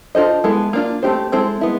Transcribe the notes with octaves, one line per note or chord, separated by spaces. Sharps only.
D4 F4 A4 C5 D#5
G#3 B3 E4 A4
A#3 D4 F4
A3 C4 E4 G4 C5
G#3 C4 E4 A4
G#3 B3 E4